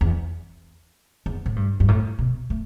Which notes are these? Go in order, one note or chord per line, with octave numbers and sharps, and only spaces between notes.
E2
E2
A2
G2
G2
A2
B2
A3